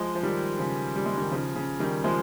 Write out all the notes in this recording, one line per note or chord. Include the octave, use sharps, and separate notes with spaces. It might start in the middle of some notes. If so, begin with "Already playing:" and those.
Already playing: F3 G#3
F3
D#3 G3
C#3 F3
G3
G#3
D#3 G3
C#3 F3
C#3
D#3 G3
F3 G#3